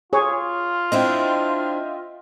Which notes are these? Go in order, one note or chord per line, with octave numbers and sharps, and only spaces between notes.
F4 G#4 C#5
C4 D4 E4 D#5 E5 G5